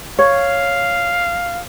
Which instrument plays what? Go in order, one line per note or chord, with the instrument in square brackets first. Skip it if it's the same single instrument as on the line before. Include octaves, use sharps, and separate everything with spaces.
[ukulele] C#5 [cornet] F5